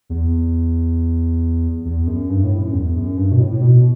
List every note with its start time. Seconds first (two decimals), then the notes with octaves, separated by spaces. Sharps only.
0.10 E2
1.85 E2
2.07 F#2
2.29 G2
2.44 A2
2.59 F#2
2.73 E2
2.96 F#2
3.17 G2
3.32 B2
3.40 A2
3.52 A2
3.62 B2